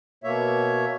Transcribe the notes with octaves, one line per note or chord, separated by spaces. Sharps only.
B2 A#3 C#5 E5